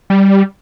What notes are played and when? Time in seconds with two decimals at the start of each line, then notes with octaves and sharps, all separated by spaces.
0.10 G3